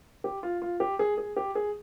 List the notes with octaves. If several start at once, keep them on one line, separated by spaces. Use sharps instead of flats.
G4
F4
F4
G4
G#4
G#4
G4
G#4